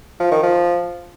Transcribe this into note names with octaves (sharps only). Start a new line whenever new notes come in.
F3
D#3
F3